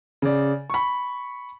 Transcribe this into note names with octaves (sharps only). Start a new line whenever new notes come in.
C#3 D5
B5 C#6